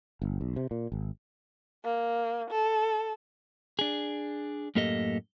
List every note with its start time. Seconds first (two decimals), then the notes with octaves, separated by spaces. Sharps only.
0.22 G1
0.41 B1
0.56 C3
0.71 A#2
0.92 G#1
1.84 A#3
2.51 A4
3.79 D4 G#4
4.75 F#2 A2 A#3 G4 A4 D#5